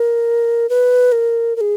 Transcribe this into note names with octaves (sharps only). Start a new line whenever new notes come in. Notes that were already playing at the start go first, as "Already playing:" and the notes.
Already playing: A#4
B4
A#4
A#4
G#4